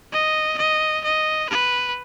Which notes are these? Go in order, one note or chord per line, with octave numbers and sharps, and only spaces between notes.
D#5
D#5
D#5
B4